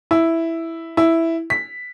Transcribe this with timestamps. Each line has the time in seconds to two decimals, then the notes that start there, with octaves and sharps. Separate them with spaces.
0.11 E4
0.97 E4
1.50 B6